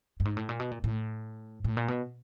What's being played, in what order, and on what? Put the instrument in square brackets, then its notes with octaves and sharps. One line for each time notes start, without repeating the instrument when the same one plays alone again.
[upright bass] G2
G#2
A2
A#2
B2
A#2
A2
A2
A#2
B2